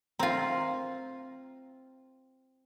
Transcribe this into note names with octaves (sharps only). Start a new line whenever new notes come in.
C4 F4 F5 A#5